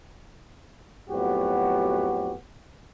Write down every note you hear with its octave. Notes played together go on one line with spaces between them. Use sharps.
F2 A2 F#3 B3 F#4 G4